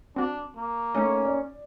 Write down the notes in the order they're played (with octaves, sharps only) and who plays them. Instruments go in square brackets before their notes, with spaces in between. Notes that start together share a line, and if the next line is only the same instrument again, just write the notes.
[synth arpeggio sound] C4 F#4 [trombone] D4
[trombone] A#3
[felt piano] A3 [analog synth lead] C#4 [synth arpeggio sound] D#4 D#5
[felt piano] D5